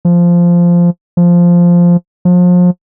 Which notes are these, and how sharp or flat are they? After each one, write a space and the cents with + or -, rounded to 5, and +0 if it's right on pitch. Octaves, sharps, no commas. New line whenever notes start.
F3 -10
F3 -5
F3 +35